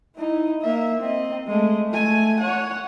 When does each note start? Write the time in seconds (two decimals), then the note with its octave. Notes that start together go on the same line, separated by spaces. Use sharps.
0.16 D#4 E4
0.62 A#3 E5
1.00 C4 D#5
1.47 G#3 A3
1.92 A3 G#5
2.39 C#5 F#5